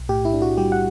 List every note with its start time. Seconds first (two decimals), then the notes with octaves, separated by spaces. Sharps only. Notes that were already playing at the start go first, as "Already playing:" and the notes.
Already playing: B1
0.09 A2 G4
0.25 E4
0.33 D4
0.42 F#4
0.57 G3 G4
0.72 F#5